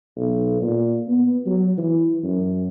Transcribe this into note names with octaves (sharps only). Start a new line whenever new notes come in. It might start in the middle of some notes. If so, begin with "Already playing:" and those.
B1
A#2
B3
F#3
E3
F#2